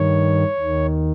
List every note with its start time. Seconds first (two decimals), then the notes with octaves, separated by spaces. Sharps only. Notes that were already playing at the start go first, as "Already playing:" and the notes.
Already playing: G2 D#3 C#5
0.58 D#2 D#3